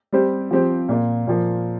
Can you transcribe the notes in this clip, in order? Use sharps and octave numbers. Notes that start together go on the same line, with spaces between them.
G3 C4 G4 C5
F3 C4 G4 C5
A#2 A#3 F4
A#2 F3 A#3